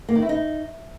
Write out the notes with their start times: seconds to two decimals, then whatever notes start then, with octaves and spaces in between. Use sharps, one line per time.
0.09 A#3
0.15 D#3
0.22 E4
0.29 D#4